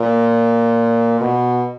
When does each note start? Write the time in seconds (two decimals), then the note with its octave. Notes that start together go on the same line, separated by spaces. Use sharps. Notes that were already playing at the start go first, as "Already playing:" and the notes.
Already playing: A#2
1.21 B2